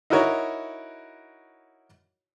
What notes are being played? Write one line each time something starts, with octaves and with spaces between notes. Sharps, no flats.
D#4 E4 F#4 A#4 C#5